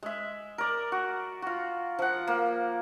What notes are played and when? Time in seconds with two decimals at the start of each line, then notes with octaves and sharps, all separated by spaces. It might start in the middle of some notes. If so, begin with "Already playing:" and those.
0.03 G#3 E5
0.58 A#4 D5
0.92 F#4
1.42 F4 F#4
1.99 F3 F#5
2.27 A#3